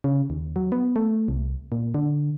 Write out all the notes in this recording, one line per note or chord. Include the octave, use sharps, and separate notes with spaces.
C#3
D#2
F#3
B3
A3
C2
A#2
D3